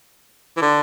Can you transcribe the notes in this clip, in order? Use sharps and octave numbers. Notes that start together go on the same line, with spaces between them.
E3
D3